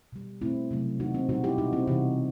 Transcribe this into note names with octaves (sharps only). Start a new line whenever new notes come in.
B2 G3
B2 A3 C4 E4
C3 F#3 A3
D#3 F#3 A3 D#4 F#4
C4
B2 G3 D#4 F#4
E4 G4
B2 G3 D#4 F#4
C4 E4
C3 E3 G3 D#4 F#4